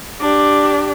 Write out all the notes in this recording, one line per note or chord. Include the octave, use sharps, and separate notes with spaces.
D4 G4